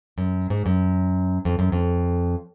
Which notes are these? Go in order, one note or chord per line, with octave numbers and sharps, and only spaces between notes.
F#2
G#2
F#2
F2
F#2
F2